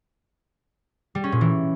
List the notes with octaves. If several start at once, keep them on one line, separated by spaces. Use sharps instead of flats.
G3
C#4
A#2
E3